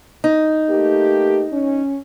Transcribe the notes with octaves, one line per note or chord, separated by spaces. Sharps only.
D#4
A3 A#3 G4
C#4